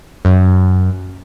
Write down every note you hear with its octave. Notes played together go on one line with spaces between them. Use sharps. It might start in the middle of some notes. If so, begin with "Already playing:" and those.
F#2